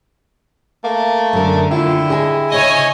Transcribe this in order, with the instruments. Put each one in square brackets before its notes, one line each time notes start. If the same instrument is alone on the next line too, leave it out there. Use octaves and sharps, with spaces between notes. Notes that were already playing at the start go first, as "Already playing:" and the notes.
[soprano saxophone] A3 [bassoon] A#3
[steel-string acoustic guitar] F#2 A#4 [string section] D3
[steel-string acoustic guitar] D#2 F4 [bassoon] E4 [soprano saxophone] G4
[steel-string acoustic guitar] G#4 D#5 G#5
[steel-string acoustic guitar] D2 C#3 [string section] C#5 G#5 [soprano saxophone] D#5